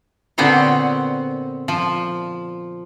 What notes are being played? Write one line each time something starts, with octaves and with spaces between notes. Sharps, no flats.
A#2 D3 B3 C4 C5 C#5
F3